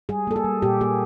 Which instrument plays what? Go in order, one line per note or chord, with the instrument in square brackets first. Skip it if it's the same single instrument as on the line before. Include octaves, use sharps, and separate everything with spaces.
[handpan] G3 G#4
A#3 A4
G#4
G3
A#2 G4
A#3 G#4